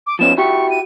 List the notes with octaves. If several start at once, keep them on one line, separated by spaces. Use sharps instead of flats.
D6
F3 B3 C#4 E7
E4 F#4 G4 C#6
D#7